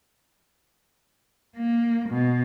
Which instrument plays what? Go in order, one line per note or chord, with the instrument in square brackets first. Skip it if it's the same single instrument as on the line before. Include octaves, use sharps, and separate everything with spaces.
[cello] A#3
B2